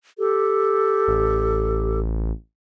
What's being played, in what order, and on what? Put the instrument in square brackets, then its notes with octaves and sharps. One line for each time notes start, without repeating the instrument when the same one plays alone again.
[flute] G4 [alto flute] A4
[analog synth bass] A1